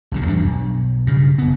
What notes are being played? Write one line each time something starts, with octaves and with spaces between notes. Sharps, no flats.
B1 A#2 D3
E2 G2 C4 D4
B1
G2 C#3
F#1 B3